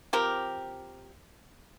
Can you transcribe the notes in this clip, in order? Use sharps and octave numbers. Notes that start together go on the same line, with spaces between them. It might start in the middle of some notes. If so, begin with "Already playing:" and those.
F3 C4 G4 A#4